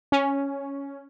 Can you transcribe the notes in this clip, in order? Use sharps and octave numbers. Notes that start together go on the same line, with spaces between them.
C#4